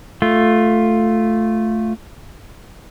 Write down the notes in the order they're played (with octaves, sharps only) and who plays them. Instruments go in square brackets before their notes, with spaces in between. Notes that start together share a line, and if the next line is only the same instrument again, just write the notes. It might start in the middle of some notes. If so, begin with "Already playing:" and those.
[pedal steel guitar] A3 F4